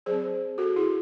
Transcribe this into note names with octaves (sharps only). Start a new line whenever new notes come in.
F#3 C4 G#4 C5
F#4 A4
E4 G#4